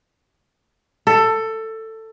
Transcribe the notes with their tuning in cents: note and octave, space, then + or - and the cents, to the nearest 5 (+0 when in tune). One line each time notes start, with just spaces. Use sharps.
A4 +15